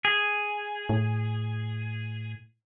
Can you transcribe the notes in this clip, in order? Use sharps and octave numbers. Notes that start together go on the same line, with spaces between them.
G#4
A2